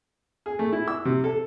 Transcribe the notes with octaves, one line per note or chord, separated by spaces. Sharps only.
G#4
A3
E4
E6
C3
A4